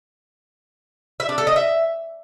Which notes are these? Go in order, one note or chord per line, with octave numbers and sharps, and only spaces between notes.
E5
D4
A4
D#5
E5